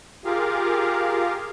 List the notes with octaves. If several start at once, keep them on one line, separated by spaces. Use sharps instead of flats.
F4 G4 G#4 A#4 F5